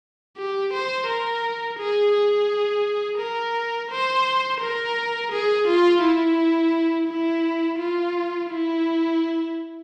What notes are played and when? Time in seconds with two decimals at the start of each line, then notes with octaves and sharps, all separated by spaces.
0.37 G4
0.73 C5
1.07 A#4
1.78 G#4
2.14 G#4
3.19 A#4
3.91 C5
4.61 A#4
5.31 G#4
5.67 F4
6.02 E4
7.08 E4
7.79 F4
8.50 E4